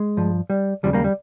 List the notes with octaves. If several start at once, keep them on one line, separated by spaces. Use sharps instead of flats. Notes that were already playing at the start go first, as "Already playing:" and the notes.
Already playing: G#3
G2 F3
G3
D#2 C#3 F3 G3
G3 A#3
G3